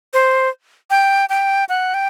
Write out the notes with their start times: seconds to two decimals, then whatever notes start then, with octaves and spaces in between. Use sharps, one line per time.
0.13 C5
0.90 G5
1.29 G5
1.69 F#5
1.94 G5